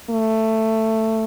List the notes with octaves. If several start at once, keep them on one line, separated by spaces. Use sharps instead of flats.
A3